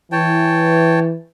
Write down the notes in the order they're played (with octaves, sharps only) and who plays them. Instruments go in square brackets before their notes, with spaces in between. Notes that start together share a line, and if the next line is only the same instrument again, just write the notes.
[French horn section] E3 [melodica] C#5 G5 A5